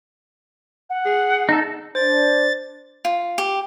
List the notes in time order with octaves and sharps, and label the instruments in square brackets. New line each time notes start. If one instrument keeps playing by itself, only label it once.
[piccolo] F#5
[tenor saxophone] G#4
[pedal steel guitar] D#4 A4
[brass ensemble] D4 [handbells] C5 [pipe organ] A6
[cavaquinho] F4
G4